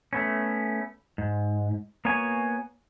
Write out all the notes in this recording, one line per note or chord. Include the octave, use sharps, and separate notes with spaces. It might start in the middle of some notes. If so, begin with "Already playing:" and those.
A3 B3 C#4
G#2
A#3 B3 F#4 C#5 G#5